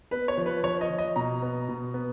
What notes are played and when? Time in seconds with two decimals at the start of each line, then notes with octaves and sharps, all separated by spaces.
0.11 B3 B4
0.28 C#5
0.37 F3
0.46 B4
0.63 F3 C#5
0.81 D#5
0.90 F3
0.98 D#5
1.16 B2 A#5
1.42 B3
1.69 B2
1.94 B3